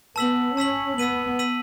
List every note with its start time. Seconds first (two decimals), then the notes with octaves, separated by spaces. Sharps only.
0.16 B3 A5 E6 B6 F#7
0.57 C#4 A5 E6 B6 F#7
0.98 B3 E6 B6 D#7 F#7
1.39 E6 B6 D#7 F#7